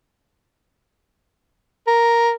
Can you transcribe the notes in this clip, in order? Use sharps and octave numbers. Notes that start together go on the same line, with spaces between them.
A#4